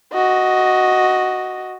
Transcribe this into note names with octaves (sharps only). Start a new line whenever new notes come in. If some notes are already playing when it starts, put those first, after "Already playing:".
F#4 D#5